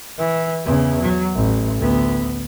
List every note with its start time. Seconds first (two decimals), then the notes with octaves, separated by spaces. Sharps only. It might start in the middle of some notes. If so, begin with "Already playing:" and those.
0.18 E3
0.65 E2 C#3
1.01 F#3
1.35 A1
1.79 D2 B3